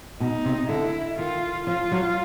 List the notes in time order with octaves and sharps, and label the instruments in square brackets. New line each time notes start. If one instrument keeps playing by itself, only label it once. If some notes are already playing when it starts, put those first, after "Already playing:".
[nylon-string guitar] B2 [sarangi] D#4
[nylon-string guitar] C3
[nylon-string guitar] D3 [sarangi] E4
[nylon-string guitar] D#3 [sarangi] F4
[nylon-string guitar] F3 [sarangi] F4
[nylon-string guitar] F#3